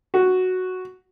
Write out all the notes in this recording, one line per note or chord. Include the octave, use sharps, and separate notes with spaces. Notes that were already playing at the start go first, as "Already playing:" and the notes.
F#4